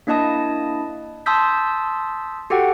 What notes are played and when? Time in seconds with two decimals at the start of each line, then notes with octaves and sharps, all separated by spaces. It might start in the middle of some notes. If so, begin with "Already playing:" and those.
0.07 A#3 D4 E4 D#5 A5 D#6
1.26 A5 C6 D#6 E6 G6 B6
2.50 F#4 G4 A4 F#5 G5